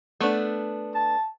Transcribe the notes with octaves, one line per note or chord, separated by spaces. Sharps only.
A3 B3 D4
A5